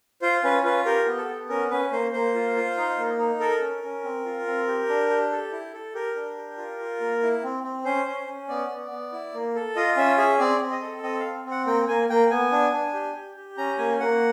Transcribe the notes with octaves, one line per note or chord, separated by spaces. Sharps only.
F4 C5
C#4 B4
F4 B4
G4 A#4
B3
A4
B3
C#4 A#4
C#4 B4
A#3 C5
A#3 C5
F4
F4
D#4
A#3
D#4
A4 A#4
C#4
C#4
C4
F4
C4
G4
D4
G4
A4
E4
A4
G4 A#4
D4
G4
F4
F4
A#3
E4
C4
C4
C#4 C5
C#4
C#4
B3 D5
B3
B3
E4
A#3
A4
F4 D#5
C#4 E5
G#4 E5
C4 D5
C4
D#5
A4
C4 D#5
F5
C4
C4
F#5
A#3 G5
A#3 G#5
A#3 G5
B3 G#5
D4
D4
G4
G4
G4
C#4 A#5
A#3 G#5
A#3 F#5